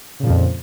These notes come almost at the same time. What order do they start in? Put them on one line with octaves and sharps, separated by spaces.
C#3 A#2 F3 F2